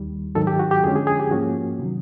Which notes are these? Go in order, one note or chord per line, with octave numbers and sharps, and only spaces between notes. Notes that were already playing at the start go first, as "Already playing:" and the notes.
Already playing: D#2 D#3 G3
G#2 D#3 F#3 A4
G4
F#4
G4
F2 D3 F3 G#3 C#4 G#4
G#4
G#4
G4
G#2 F3 A#3 C#4 F#4
C3 D#3 F#3